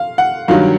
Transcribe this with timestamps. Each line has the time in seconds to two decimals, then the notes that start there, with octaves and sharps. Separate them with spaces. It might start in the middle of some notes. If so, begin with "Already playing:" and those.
Already playing: F5
0.18 F#5
0.48 G2 D#3 F#3 F5